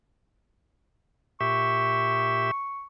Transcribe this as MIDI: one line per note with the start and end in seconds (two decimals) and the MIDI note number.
1.41 2.51 46
1.41 2.51 67
1.41 2.51 76
1.41 2.86 85